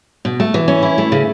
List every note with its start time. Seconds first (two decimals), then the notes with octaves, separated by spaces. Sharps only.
0.25 B2
0.40 A3
0.54 E3
0.68 C#4
0.83 E4
0.98 A3
1.12 C#3